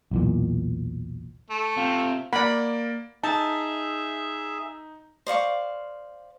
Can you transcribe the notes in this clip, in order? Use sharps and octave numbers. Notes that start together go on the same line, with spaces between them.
B1 E2 A#2
A3
C3 F4
A#3 D5 F#5 B5
D#4 G#4 E5 A5
C5 D5 F5 C#6